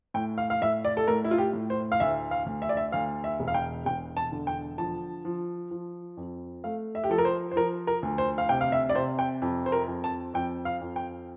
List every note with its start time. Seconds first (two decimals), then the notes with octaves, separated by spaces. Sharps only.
0.14 A2 G5
0.38 F5
0.50 F5
0.62 A2 E5
0.85 D5
0.97 A4
1.07 A2 A#4
1.25 E4
1.31 F4
1.38 G4
1.53 A2
1.70 C5
1.92 F5
2.00 D2 E5
2.31 F5
2.46 D2
2.62 E5
2.69 D5
2.77 E5
2.92 D2 F5
3.24 E5
3.39 E1
3.48 F5
3.54 G5
3.85 E1 G5
4.17 A5
4.32 D3
4.47 G5
4.78 F3 A5
5.25 F3
5.71 F3
6.17 F2
6.64 A3 F5
6.95 E5
7.04 G4
7.09 F3 A4
7.18 A#4
7.25 C5
7.51 C5
7.56 F3 A#4
7.87 A#4
8.03 D2
8.18 C5
8.38 F5
8.49 C3 G5
8.61 F5
8.72 E5
8.89 D5
8.95 C3 C5
9.19 G5
9.42 F2
9.66 C5
9.72 A#4
9.88 F2
10.04 A5
10.34 F2 G5
10.65 F5
10.81 F2
10.96 G5